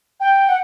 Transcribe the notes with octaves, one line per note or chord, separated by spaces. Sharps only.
G5
F#5